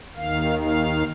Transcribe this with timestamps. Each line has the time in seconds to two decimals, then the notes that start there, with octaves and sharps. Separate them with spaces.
0.15 D#2 D#3 F5
0.59 F5